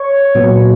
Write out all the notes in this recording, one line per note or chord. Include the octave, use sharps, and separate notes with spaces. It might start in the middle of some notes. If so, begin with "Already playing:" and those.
Already playing: C#5
A#2 F#3 B3